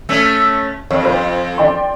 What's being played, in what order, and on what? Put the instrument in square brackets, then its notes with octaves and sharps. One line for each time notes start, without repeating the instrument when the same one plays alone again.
[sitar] A3 C#4
[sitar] F2 [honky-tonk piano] C#5
[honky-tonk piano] F4 C5
D5 G5 C6